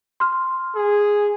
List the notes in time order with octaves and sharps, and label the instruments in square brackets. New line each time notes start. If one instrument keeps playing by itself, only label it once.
[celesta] C6 F6
[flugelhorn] G#4